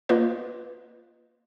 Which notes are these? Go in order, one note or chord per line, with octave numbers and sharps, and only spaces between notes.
A#3 F4 B4 D#5